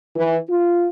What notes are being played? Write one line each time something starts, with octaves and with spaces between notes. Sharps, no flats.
E3
F4